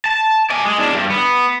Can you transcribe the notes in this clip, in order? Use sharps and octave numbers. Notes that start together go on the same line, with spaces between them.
A5
D5 G#5
G#3
E2 D4
G2
B3